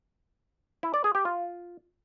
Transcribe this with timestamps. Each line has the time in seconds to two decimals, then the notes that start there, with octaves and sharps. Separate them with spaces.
0.83 E4
0.94 D5
1.04 G#4
1.15 G4
1.25 F4